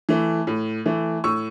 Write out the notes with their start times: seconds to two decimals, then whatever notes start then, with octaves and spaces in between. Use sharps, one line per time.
0.09 E3 A3
0.47 A2
0.86 E3 A3
1.24 A2 C#6 E6